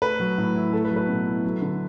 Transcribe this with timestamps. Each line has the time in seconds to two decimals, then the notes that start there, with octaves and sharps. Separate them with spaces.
0.02 A3 B4
0.20 F#3
0.38 A2
0.55 E4
0.73 A3 A4
0.85 B4
0.91 F#3
0.96 B4
1.09 B2
1.27 E4
1.44 F#3
1.61 D3